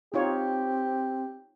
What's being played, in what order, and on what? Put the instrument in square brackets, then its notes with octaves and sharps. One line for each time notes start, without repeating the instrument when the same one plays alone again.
[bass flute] C4 [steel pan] D#4 F4 C#5 [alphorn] G4